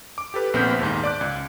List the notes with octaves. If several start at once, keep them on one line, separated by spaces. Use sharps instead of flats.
D6
G4 A4 B4
A#1 B3 C4 F6 G6 B6
D#2 G#2
D5 D6 F#6
C#2